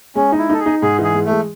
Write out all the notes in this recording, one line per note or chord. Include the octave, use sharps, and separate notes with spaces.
G#3 C#4
D#4
E4
D#4 A4
G#4
D#4
G#2 G#4
E3
G#4
G#3
A3
G#3